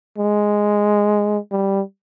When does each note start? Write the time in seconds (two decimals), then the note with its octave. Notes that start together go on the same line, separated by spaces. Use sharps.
0.18 G#3
1.52 G3